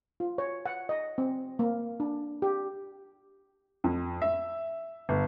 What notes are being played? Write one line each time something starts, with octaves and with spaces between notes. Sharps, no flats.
F4
C#5
F#5
D#5
C4
A#3
D4
G4
F2
E5
G1